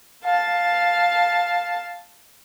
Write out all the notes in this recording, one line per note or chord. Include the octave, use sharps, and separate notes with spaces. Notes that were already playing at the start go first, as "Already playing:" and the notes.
F5 A5